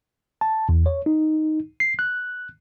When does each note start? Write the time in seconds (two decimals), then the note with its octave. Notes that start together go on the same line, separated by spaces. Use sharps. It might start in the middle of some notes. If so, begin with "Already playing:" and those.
0.41 A5
0.69 E2
0.86 C#5
1.06 D#4
1.80 C7
1.99 F#6